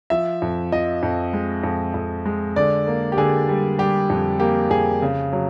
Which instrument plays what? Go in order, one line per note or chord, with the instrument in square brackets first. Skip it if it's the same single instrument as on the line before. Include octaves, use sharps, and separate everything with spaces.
[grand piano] F3 E5
F2
F3 D#5
F2
G#3
F2
F2
G#3
D3 D5
A#3
G4
D3 G#4
G3
G3 G4
F2
A#3 G4
F2 G#4
C#3
F#3